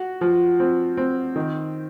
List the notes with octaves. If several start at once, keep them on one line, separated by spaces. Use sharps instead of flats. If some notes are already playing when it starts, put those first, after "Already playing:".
Already playing: F#4
F3
C4
C4
D#3